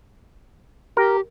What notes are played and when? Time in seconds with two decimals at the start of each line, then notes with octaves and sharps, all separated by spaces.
0.97 G4 A#4